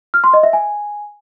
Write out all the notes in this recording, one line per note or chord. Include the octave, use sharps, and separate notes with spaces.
F6
C6
D#5
E5
G#5